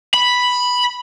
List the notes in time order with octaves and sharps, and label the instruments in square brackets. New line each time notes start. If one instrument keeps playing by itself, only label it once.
[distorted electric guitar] B5